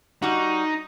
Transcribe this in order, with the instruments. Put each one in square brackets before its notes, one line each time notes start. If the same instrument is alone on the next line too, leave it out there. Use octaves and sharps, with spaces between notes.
[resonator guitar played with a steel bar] G3 F#4 [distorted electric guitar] D#4